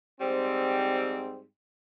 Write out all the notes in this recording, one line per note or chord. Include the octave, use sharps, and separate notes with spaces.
G#2 G3 C4